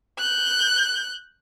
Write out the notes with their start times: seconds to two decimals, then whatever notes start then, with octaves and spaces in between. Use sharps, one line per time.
0.18 F#6 G6